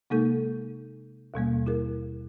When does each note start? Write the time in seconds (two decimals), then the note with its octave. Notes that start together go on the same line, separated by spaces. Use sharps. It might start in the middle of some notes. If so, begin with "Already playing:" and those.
0.10 C3 G#3 A#3 D#4 A4
1.34 D#2 B2 G3 A#3
1.66 E4 G#4 A#4